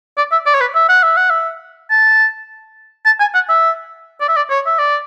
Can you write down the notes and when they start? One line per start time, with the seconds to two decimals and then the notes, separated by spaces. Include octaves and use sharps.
0.17 D5
0.32 E5
0.46 D5
0.54 C#5
0.60 B4
0.75 E5
0.89 F#5
1.03 E5
1.17 F#5
1.30 E5
1.90 A5
3.06 A5
3.20 G#5
3.34 F#5
3.49 E5
4.20 D5
4.28 E5
4.36 D5
4.50 C#5
4.66 E5
4.79 D5